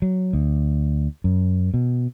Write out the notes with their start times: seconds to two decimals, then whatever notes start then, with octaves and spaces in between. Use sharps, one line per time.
0.02 F#3
0.33 D2
1.24 F#2
1.74 B2